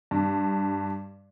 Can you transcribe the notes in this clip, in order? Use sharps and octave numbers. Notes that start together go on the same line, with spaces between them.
G2